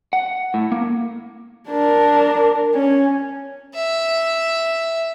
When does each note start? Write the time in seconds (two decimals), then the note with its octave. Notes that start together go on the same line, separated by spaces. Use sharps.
0.13 F#5
0.54 A2
0.72 A#3
1.69 D4 A#4
2.74 C#4
3.75 E5